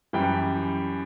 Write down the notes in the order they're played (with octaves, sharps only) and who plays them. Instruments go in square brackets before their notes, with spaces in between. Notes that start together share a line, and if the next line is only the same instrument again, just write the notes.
[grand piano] F#2 E3 G3 G5